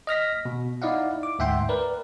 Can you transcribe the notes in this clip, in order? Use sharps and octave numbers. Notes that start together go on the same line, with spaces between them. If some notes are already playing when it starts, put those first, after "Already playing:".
D#5 F6 A#6 B6
B2
D#4 E4 D5 D#5 F5 F#5
D6
D2 G#2 E5 F#5 G5 C6
A#4 B4 D5